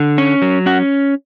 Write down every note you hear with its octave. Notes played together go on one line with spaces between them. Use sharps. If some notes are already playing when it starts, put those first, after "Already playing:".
Already playing: D3
C#4
F#3
C#4 F#4